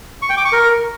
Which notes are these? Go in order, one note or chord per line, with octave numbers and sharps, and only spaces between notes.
C#6
G5
D6
C#6
A#4